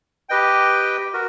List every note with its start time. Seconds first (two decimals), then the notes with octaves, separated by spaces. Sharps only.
0.29 G4 B4 D#5 G5
1.14 F#4 A#4